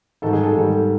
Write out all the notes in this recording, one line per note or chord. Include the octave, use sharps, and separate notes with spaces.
G#2 D#3 G3 A4
G#4
A4
G#2 D#3 G3